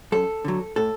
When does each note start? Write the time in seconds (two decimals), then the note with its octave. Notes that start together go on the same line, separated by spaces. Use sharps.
0.12 F#2 A4
0.45 D3 F#3
0.76 A2 A4